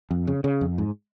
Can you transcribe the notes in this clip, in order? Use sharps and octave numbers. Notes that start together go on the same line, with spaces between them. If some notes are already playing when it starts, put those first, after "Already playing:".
F2
C#3
C#3
F2
G#2